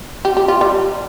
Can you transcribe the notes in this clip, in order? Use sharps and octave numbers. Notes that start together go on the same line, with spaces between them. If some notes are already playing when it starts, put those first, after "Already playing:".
G4
G4
F4
G3